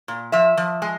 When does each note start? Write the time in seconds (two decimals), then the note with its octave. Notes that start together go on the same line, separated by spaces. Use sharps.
0.08 A#2
0.32 F3 E5
0.57 F3
0.82 G#3